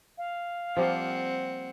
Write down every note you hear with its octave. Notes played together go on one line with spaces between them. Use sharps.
F5
F3 G3 A#3 C4 F#5